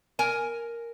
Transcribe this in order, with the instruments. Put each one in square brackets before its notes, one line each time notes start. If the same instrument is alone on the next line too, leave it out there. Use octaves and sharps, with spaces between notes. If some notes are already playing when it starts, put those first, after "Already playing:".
[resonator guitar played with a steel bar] A#4 G#5